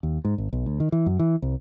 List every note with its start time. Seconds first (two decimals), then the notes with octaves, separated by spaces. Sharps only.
0.03 D#2
0.25 G#2
0.38 G#1
0.53 B1
0.66 D2
0.80 D#3
0.92 E3
1.06 F#2
1.19 E3
1.42 C2